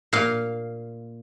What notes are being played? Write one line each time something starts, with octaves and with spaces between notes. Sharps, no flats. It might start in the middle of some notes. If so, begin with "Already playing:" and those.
A#2 F5